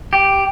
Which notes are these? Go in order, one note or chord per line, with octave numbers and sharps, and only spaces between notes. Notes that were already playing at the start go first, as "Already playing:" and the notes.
G4